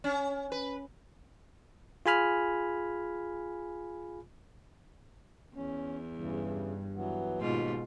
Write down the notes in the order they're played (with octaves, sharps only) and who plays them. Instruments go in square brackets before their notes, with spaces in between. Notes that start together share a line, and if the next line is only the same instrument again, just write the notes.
[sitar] C#4
B4
[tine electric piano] F4 G#4 G#5 B5 F6
[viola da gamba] E2 [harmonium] C#4
[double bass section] G2 [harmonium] C#3 E3
[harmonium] E3 F#3 B3
[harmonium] D#2 [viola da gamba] G#2 B2 F4